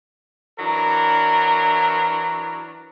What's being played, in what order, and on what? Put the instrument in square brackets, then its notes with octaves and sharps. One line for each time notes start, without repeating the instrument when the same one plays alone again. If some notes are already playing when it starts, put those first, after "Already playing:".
[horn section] E3 F#3 D4 A#4